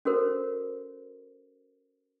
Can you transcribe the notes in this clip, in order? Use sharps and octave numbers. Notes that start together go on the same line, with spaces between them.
C#4 F#4 A4 A#4 C5